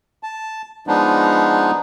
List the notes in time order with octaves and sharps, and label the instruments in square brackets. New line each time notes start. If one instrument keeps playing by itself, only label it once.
[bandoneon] A5
F3 G#3 B3 D4 D#4